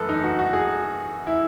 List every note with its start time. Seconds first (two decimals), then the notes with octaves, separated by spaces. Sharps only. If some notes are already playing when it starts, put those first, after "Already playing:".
Already playing: F#2 E3 A3 A4 B4
0.09 D#4
0.23 F#4
0.39 F#4
0.53 G#4
1.27 E4